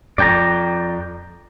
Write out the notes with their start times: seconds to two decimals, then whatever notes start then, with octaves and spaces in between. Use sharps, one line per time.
0.18 F2 D5 G5 A#5